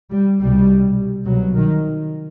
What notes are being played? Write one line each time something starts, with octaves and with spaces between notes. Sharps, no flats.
G3
C2 B2 G3
C2 B2 F#3
D#3